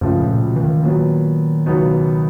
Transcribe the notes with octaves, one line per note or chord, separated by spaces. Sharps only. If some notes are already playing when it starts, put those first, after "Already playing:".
C#2 G2 C#3 F3 A3
A#2
B2
E3
D#3
A#2 F#3 B3
C#2 B2 F#3 B3 D#4